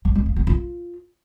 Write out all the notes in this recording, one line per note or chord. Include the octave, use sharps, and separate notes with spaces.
F#3
G#3
A#3
B3
F4